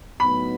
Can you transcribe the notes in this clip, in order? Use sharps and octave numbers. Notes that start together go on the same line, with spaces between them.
A2 F#3 B3 D#4 F#4 B5